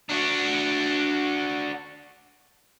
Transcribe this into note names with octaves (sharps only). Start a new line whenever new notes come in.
D4 F#4